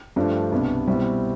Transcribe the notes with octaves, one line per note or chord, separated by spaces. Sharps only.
G2 F3 A3 D4
C2 B2 B3 D4
B2 G3 C4 E4